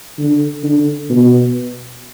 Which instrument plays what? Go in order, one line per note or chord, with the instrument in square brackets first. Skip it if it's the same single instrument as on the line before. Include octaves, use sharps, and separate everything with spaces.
[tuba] D3
D3
B2